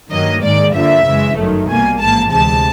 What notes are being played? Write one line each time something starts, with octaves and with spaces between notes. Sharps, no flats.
G2 D#3 F#3 A#3 D#5
G#2 D#3 G#3 D5
G2 D3 F3 A#3 E5
F#2 C#3 E3 G#3
G1 F#2 D#3 F#3 A3
C2 B2 G3 A#3 G#5
A1 G#2 F3 A#3 A5
D2 C3 E3 G#3 A5